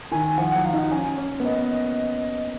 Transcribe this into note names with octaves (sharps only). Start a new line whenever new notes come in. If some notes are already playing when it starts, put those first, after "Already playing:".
D#3 G#5
F3 F#5
F#5
F#3
F5
D#4
F#5
C#4 G#5
C#4
B3
A#3 D#5
D#5